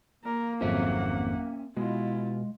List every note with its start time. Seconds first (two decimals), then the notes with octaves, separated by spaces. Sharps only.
0.24 A#3 A#4
0.61 G#1 F2 F3 F#3 C4 C#4 E5 F#5
1.77 B2 G#3 E4 F4